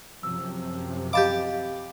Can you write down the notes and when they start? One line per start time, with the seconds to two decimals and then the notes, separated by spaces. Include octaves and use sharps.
0.23 F#2 C3 F3 E6
1.13 G4 D#5 F5 A5 B5 D6